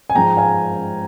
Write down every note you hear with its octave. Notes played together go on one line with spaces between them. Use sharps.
G#5
G#2 F3 G#3 G5 A#5
F5 G#5